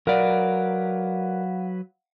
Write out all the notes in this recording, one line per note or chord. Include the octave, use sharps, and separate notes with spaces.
F#3 A#4 B4 D5 F5 F#5